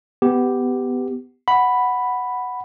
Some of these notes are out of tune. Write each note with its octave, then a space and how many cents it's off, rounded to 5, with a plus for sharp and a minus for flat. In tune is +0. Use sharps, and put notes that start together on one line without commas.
B3 +15 G4 +0
F#5 +0 B5 +0